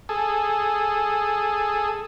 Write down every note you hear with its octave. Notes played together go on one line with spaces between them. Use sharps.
G#4 A4